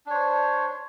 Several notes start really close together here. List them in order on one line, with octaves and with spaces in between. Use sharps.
D4 C#5 C5